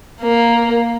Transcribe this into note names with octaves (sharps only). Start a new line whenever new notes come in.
A#3